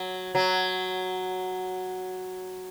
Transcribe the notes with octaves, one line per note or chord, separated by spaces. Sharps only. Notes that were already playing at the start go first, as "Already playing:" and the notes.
Already playing: F#3
F#3